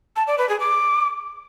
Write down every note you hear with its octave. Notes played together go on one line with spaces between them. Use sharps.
A5
D5
B4
G#4
D6